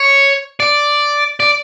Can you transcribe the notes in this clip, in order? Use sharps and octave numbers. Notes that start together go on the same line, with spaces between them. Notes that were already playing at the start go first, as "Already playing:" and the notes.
Already playing: C#5
D5
D5